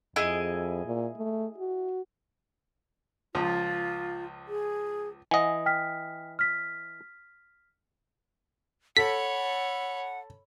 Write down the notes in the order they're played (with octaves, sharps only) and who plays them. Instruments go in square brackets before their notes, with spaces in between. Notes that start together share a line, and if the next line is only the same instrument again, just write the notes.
[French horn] F2 [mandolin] E4 G#4 D#5
[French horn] A#2
A3
F#4
[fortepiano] C#2 F3 [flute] F4
[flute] G#4
[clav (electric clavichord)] E3 D#5 [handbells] F#5 G#5
[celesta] G5 F6 B6
F6 B6
[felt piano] A4 [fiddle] C#5 B5 [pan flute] F#5 [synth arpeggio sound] B6